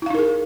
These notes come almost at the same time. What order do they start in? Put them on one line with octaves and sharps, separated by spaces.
E4 F5 D#4 A#4 G#4